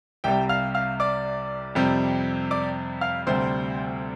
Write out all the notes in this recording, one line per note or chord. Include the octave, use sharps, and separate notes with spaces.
C2 C3 G3 G4 G5
F5 F6
F5 F6
D5 D6
F2 C3 G3 C4
D5 D6
F5 F6
D2 C3 G3 C4 C5 C6